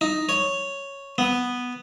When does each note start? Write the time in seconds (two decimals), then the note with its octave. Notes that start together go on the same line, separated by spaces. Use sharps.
0.01 D#4
0.29 C#5
1.18 B3